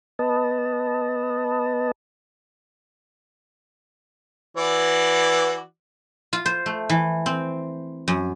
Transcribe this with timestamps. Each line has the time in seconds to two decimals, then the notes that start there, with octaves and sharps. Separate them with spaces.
0.19 B3 B4 D#5 A5
4.57 E3 F#4 B4 D5
6.33 F4
6.46 C5
6.66 A3
6.89 E3
7.26 C4
8.08 F#2